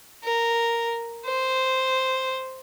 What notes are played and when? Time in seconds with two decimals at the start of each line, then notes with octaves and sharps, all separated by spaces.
0.24 A#4
1.26 C5